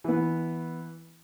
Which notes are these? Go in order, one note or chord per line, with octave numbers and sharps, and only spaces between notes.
E3 B3